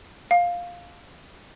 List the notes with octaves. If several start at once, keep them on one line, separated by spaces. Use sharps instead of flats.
F5